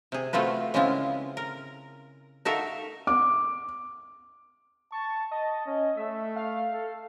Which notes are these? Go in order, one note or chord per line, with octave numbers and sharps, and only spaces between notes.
C3 G#4
A3 C4 F4 F#4 B4
C#3 G#3 B3 C4 E4 F4
A#4
D#4 F#4 A4 A#4 E5 F5
D6
A5 C#6
D#5 A5
C#4
A3 E5
F5
A4